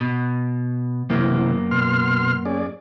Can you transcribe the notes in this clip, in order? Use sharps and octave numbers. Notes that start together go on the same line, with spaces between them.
B2
F#2 C3 E3 A#3 B3
B2 C6 F6
C#4 G#4 D5